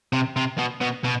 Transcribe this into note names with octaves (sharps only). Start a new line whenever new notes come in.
C3
C3
B2
B2
B2